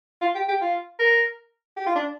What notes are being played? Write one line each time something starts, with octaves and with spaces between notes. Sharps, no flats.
F4
G4
G4
F4
A#4
G4
F4
D4